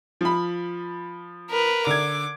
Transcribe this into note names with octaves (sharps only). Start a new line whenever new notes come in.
F3 B5
A#4 B4
D3 D6 G#6